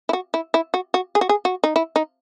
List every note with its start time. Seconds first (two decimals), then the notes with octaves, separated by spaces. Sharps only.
0.09 E4
0.13 F#4
0.34 E4
0.54 E4
0.74 F#4
0.94 F#4
1.15 G#4
1.21 F#4
1.29 G#4
1.45 F#4
1.64 D#4
1.76 E4
1.96 D#4